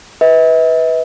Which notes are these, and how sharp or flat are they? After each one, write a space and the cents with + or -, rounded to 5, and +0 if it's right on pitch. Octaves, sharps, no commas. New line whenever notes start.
B4 +0 E5 -45